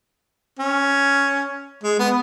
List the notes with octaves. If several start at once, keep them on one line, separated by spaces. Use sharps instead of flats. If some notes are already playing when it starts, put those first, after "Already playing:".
C#4
G#3
B3